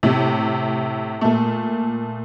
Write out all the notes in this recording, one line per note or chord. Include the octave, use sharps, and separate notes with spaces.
A2 C3
A#2 A3